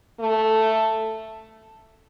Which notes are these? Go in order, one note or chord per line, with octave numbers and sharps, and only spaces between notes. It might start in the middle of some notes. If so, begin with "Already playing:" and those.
A3